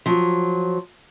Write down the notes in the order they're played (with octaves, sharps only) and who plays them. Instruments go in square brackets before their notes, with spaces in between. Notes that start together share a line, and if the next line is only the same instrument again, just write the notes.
[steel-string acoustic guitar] F3 F#3